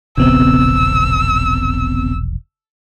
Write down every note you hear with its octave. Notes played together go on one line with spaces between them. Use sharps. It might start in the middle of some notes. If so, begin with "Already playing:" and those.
E1 A#1 C#3 B3 C4 E6